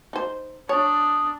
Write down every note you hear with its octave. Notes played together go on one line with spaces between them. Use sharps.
D#4 C5
D4 C#5 D#6